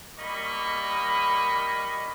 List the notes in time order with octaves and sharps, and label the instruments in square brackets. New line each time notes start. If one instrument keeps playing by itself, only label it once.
[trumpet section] G3 A#3 D#5 B5 C#6